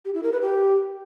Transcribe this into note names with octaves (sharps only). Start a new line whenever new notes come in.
G4
E4
A#4
B4
G4